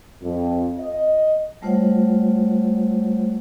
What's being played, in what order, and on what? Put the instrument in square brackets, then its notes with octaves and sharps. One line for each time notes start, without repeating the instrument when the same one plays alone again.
[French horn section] F2
D#5
[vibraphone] G3 A3 F4 C5 C#5 F#5